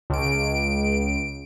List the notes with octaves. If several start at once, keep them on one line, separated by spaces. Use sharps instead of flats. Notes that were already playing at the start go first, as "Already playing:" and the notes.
C#2 D7